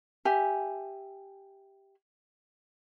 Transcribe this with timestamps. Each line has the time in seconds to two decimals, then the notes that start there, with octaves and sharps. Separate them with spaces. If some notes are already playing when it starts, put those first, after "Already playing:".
0.25 G4 E5 G#5